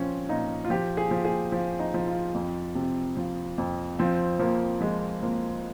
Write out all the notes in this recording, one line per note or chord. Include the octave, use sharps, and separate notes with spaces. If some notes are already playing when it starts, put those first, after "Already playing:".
Already playing: A#2 F3 C4 C#4
A#2 D#4
F4
F3 G4
G#4
F3
G#4
F3
D#4
F3
F4
F2
C3
F3
F2
F3 C4
F3 A#3
F3 G#3
F3 A#3